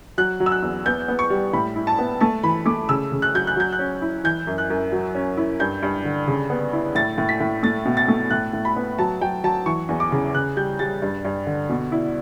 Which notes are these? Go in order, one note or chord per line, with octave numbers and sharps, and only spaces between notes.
F#3 F#6
F#3
E6
F#6
E2
B3 G6
B3
C#6
G3
A2 B5
E4
A5
B3
A3 A5
E3 B5
A3 D6
C#3 E6
C#3
F#6
F#3 G6
F#6
F#3 G6
F#6
C#4
E4
E3 G6
F#2
F#6
F#2
F#3
C#4
E4
G2 G6
G2
D3
C#3
B3
E4
A2 A6
A2
B6
A2
A3 A6
B2
A6
A3
A2 F#6
A2
B5
B3
F#3 A5
F#3 G5
F#3 A5
E3 C#6
E2
D6
C#3
C#3 F#6
G3 G6
G3 A6
G2
G2
D3
B2
E4